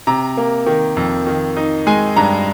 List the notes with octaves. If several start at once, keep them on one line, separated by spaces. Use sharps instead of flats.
C3 A#5
A#3
D#3
F2
D#3
D#4
G#3 G#5
G2 A#5